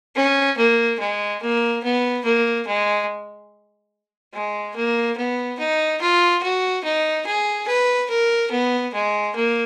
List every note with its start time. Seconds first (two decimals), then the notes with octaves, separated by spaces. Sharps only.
0.16 C#4
0.57 A#3
1.00 G#3
1.42 A#3
1.84 B3
2.25 A#3
2.67 G#3
4.34 G#3
4.76 A#3
5.17 B3
5.59 D#4
6.01 F4
6.43 F#4
6.84 D#4
7.27 G#4
7.68 B4
8.10 A#4
8.51 B3
8.94 G#3
9.35 A#3